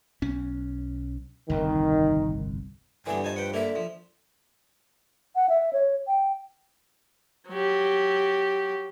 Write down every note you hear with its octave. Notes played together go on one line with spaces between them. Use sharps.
B1 C#4
G1 C2 F2 D#3
G2 D3 E3 B3 G#5
F3 D#5 G#5 A5
B4 F#5 G5
D3 A#3 E5
F3
F#5
E5
C#5
G5
F#3 G4